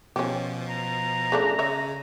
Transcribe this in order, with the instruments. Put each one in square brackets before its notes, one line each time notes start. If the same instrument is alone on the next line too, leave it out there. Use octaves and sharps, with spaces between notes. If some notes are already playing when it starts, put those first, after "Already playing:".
[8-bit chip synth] B2 F3 [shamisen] C#4 G4
[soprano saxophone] A#5
[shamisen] C#3 A3 D4
[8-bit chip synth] C#3 [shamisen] C#5 E5